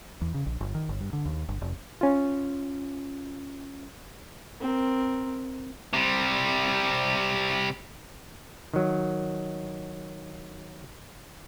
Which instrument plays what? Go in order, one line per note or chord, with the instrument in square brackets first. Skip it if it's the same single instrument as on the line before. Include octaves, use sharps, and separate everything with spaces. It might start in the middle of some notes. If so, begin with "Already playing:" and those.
[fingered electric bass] E2
C#3
A#1
G1
D#3
G1
G2
D3
D#2
G1
F1
[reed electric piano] C#4 F4
[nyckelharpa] C4 A#4
[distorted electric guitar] C3 G3
[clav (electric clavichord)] D#3 F#3